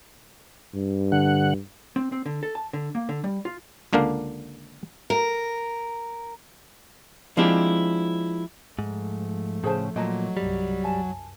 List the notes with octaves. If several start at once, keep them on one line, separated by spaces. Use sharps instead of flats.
G2
D3 F#5
C4
C4
D3
A4
A5
D3
A#3
D3
G3
F4
C#2 D3 A#3 D4 F5
A#4
F3 G#3 C4 D4 E4 G4
G#2 F3 A3
A2 C#3 G#4 C5 A5
A#2 F#3 D#5 A5 A#5
C2 G2 G3
F#2 G#5 A5